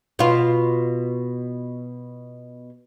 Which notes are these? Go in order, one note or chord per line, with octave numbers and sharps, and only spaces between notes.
B2 F4